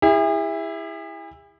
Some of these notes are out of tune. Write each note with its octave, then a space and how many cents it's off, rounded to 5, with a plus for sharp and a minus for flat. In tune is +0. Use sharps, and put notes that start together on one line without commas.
E4 +0 G#4 -45